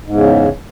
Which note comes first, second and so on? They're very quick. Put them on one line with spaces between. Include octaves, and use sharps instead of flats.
G#2 E2 C#3